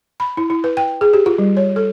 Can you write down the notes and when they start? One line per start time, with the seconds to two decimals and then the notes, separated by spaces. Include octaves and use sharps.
0.20 B5
0.37 E4
0.50 E4
0.64 B4
0.77 G5
1.01 G#4
1.14 G4
1.26 F4
1.38 G3
1.57 C#5
1.76 A4